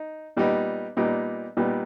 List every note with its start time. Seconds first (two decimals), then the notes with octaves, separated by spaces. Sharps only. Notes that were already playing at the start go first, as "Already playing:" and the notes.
Already playing: D#4
0.37 A#2 G3 B3 D#4 G4
0.97 A#2 G3 B3 D#4 G4
1.57 A#2 G3 B3 D#4 G4